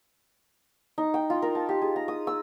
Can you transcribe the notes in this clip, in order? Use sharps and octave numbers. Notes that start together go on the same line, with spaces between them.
D#4
G5
F4
A#4
A5
G4
G#4
A#5
D#6
E6